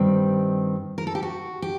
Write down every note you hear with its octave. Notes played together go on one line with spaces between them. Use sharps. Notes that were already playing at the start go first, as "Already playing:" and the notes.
Already playing: G2 D#3 G3 C4
A#4
A4
G4
F#4
G4